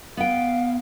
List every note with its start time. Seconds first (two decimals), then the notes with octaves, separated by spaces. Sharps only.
0.17 B3 F5 G5